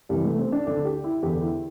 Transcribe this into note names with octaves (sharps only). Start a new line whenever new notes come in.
C2 C3 E3 G3
A3
C4
D4
D2 D3 D4
G4
E4
E2 D3 G4
E4